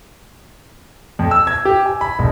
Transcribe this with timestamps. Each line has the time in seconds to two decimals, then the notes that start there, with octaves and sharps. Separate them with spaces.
1.19 F2
1.31 E6
1.47 G#6
1.65 G4
1.86 G#5
2.01 B5
2.19 E1